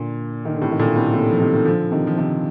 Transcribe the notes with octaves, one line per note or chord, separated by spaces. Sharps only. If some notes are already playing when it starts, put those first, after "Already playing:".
Already playing: A#2 D3
D#3
D3
A2 C3
D#3
A#2 D3
A2 C3
A2 C3
F3
C3 D#3
D#3
D3 F3
C3 D#3
F3
C3 D#3